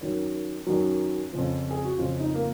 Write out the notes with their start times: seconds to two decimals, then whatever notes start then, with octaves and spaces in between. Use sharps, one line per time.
0.01 F#2 D#3 F#3
0.67 F#2 D#3 F#3
1.33 F2 C#3 F3
1.71 G#4
1.85 F#4
1.98 F2 C#3 F3 F4
2.20 D#4
2.34 A#3